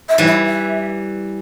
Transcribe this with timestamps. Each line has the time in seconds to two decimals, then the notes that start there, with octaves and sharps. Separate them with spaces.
0.09 E5
0.18 E3 G3
0.27 E5
0.46 E5